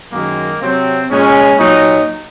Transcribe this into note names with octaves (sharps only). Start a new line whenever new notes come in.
F#2 D#3 G#3 A#3
C3 F#3 C4
A#2 G#3 C#4
A#2 F#3 D#4